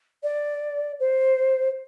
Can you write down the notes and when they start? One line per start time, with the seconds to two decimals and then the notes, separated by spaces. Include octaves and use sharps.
0.23 D5
0.99 C5